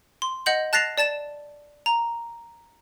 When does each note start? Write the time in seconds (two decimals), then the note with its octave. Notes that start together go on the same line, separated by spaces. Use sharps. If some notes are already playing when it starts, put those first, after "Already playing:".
0.22 C6
0.46 D#5 F#5 G6 F#7
0.73 A5 F#6 A6 A#6 C7 F7
0.98 D5 A5 A6 E7
1.86 A#5